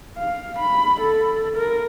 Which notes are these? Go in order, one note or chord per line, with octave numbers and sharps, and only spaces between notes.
F5
B5
A4
A#4